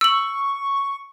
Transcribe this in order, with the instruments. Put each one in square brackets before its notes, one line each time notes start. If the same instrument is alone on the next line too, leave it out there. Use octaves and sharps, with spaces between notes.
[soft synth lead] C#6 [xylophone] E6 F#7